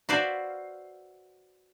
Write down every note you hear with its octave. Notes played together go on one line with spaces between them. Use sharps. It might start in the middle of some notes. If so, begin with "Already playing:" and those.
F#4 B4 C5 D5 E5 F5